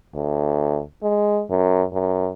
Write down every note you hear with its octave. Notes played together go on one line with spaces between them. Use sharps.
D2
G#3
F#2
F#2